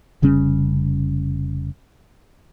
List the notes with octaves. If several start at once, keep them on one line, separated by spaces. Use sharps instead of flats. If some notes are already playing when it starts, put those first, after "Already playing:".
F1 C#3 G3 C#4